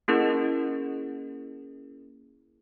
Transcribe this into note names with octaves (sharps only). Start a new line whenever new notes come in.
A#3 C#4 E4 G#4 A#4